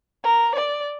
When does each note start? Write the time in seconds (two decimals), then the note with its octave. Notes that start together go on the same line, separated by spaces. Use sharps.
0.24 A#4
0.55 D5